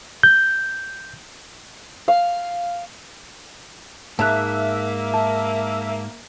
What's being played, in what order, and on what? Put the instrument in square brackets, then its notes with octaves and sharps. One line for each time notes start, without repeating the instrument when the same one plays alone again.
[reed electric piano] G6
[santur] F5
[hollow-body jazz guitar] G#2 A#5 [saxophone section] A#3 [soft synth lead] E5 [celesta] A5 F#6
[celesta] A5